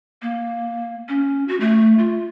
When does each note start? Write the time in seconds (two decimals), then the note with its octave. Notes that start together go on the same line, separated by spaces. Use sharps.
0.22 A#3
1.09 C#4
1.48 F#4
1.60 A3
1.99 F4